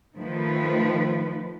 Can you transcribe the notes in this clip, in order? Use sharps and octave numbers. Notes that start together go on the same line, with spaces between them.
D#3 F3 A3 B4